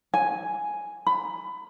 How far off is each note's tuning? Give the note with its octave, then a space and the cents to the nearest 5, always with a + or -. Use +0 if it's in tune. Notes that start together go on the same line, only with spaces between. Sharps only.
G#5 +0
B5 +25